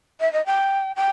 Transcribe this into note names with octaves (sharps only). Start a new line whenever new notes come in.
E5
D#5
G5
G5